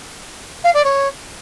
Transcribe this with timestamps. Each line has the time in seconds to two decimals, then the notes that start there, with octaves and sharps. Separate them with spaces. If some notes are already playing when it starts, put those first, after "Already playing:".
0.64 F5
0.74 D5
0.84 C#5